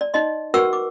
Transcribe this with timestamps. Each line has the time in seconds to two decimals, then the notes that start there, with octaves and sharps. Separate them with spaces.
0.01 D5
0.14 D#4 D5 D#5 C6
0.54 F#4 A#4 B4 F#5 C#6 E6
0.73 D6